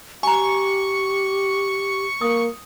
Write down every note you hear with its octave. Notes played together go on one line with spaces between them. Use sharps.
G4 G#5 A#5 C#6
A#3 D#6